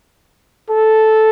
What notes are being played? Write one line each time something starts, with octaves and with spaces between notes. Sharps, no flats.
A4